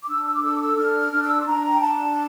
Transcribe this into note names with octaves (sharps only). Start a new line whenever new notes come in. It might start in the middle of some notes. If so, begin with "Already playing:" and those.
D6
D4 E6
E6
D6
A4 E6
D6
E6
D4 F6
F6
D4
E6
C6
D4 A#5
G5
D4 A5